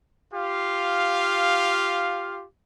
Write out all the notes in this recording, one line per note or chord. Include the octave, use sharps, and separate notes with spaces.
F4 G4 F5